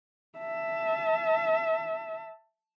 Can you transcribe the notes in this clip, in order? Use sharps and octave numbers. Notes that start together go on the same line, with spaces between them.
E5 A5